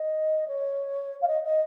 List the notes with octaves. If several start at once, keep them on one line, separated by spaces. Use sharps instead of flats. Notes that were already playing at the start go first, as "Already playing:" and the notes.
Already playing: D#5
C#5
F5
D#5
D#5